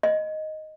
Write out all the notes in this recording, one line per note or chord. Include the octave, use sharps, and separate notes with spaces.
D#5